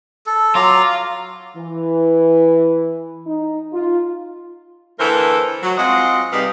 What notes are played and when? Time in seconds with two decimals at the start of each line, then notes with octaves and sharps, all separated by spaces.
0.26 A4
0.55 F#3 F4 A#5 D6
1.56 E3
3.26 D#4
3.73 F4
4.98 D3 E3 A3 A4 A#4 C5
5.62 F#3
5.77 G#3 C4 F4 D#5 F#5
6.32 C3 G3 D#4 G#4 B4 F5